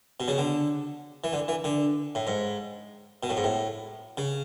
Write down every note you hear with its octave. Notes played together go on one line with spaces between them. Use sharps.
B2
C#3
D3
E3
D3
E3
D3
A2
G#2
B2
A2
G#2
A2
C#3